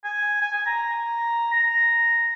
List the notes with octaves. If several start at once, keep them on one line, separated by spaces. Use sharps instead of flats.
G#5
G#5
G#5
A#5
A#5